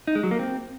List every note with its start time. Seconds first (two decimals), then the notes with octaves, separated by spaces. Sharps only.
0.07 D#4
0.15 G#3
0.23 F#3
0.31 A#3
0.39 C4